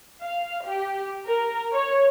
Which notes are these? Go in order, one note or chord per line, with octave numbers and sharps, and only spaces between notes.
F5
G4
A#4
C#5